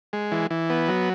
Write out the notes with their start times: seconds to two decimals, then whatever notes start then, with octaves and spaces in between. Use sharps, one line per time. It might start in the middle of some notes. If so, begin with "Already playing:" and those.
0.13 G#3
0.32 E3
0.51 E3
0.70 B3
0.88 F#3